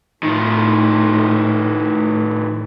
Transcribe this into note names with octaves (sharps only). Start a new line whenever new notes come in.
A2 D#3 F3